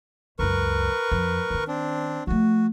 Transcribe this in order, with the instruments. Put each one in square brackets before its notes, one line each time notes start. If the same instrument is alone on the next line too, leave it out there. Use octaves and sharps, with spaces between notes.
[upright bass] C#2 F#2 [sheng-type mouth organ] A#4 B4 C#6
[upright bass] F2
D#3 C#4
[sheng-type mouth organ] C4 D4
[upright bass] F3 A3 [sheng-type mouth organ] F#4